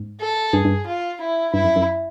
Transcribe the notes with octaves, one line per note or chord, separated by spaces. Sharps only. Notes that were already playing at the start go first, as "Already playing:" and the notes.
Already playing: G#2
A4
G2 G#4
G2
F4
E4
G2 E4
F#2
F#2